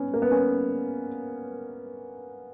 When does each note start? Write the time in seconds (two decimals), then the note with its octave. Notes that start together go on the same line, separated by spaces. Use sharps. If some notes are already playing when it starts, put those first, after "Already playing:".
Already playing: B3 C#4
0.14 A#3
0.22 B3
0.32 C#4